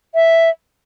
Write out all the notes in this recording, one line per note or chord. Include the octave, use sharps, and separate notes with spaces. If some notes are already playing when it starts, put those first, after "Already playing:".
E5